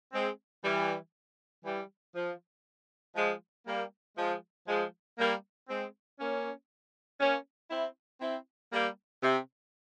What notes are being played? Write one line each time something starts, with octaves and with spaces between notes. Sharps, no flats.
G#3 C4
E3 G3
E3 G3
F3
F3 G#3
G3 A#3
F3 G#3
F3 G#3
G3 A#3
G#3 C4
A#3 C#4
A#3 C#4
C4 E4
C4 E4
G3 A#3
C3